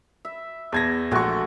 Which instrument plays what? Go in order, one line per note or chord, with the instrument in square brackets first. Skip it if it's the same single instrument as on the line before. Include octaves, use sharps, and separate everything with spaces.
[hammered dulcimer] E5
[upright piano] E2 G#6 A#6 [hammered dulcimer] A5
[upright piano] A#1 C#6 [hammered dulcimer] G#3 A3 F#4